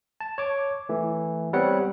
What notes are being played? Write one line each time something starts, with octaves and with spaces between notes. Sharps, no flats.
A5
C#5 D6
E3 A3
G3 B3 C4 C#5 F#5